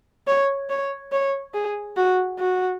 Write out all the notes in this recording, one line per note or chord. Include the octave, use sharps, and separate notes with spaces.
C#5
C#5
C#5
G#4
F#4
F#4